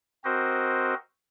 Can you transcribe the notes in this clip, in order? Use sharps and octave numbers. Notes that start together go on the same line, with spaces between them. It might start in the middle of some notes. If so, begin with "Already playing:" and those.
C4 F#4 A#4 C5 D#5